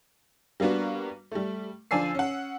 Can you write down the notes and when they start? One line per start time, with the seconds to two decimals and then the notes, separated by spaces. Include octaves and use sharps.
0.60 G3 A#3 B3 D4 F#4
1.32 G3 A3
1.91 D3 F3 D5 G#5 E6 C7
2.15 C#4 F#5